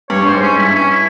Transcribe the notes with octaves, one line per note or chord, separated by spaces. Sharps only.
G2 C#5
G#2 C5
G#2 C#4
G2 E4
C#4
E4